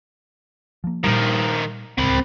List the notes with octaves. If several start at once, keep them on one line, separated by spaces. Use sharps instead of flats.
F3 A#3
A#2 D#3 F3 G3
D1 C#2 C4 B5